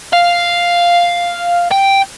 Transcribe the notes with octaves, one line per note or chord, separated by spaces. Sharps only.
F5
G5